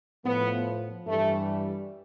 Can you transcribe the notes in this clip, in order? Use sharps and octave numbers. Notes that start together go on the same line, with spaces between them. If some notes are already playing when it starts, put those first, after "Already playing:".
A2 F3 B3
G2 E3 G3 A3